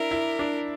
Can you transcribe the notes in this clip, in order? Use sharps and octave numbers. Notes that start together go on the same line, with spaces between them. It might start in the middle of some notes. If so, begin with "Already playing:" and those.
Already playing: D4 E4 A#4
E4
D4